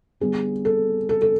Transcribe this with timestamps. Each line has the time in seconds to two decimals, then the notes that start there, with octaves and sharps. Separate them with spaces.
0.20 D3 G3 B3 G#4
0.65 A4
1.09 A4
1.22 A4